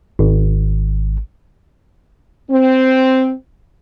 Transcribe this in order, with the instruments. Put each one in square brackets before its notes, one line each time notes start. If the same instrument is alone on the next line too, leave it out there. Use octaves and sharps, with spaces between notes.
[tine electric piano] G#1
[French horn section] C4